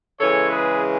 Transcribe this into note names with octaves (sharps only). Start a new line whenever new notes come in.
C#3 E3 G#3 A4 C#5
G#4 B4